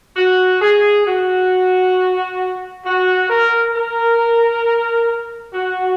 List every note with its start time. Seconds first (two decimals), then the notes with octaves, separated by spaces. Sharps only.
0.16 F#4
0.62 G#4
1.06 F#4
2.85 F#4
3.29 A#4
3.74 A#4
5.53 F#4